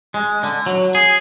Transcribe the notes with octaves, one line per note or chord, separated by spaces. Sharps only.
G#3
D3
F#3
G#4